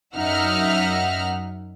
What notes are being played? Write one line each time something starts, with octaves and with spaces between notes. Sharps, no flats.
F#2 D#4 E5 F#5 F6